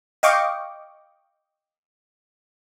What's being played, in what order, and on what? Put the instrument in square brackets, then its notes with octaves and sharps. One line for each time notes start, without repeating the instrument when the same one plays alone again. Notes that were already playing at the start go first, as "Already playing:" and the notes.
[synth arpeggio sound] D#5 F5 G5 C#6 D6